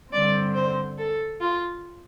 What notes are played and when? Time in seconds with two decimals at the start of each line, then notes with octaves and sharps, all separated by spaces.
0.12 G2 D3 G3 C4 D5
0.54 C5
0.98 A4
1.40 F4